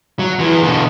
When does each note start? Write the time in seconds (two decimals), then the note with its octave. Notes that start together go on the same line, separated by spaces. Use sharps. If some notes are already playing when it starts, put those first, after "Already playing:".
0.19 F#3
0.39 E2 E3
0.63 B2 D3